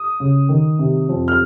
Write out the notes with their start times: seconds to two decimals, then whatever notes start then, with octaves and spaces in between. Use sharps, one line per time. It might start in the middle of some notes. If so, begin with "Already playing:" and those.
Already playing: D#6
0.20 C#3
0.49 D#3
0.79 C3
1.09 F2
1.28 F6